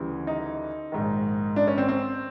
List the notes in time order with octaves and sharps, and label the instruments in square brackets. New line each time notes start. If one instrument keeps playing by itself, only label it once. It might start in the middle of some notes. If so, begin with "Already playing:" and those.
Already playing: [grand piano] D2 C#3 E3 G3
D#4
A#1 G#2 D#3
D4
C#4
C4
C4